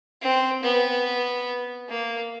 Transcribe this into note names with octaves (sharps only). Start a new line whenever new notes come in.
C4
B3
A#3